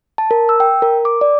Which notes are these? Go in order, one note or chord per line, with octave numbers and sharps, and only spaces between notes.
A5
A#4
E6
G5
A#4
D6
D5